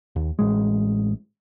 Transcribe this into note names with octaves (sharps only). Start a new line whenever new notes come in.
D#2
A1 G#3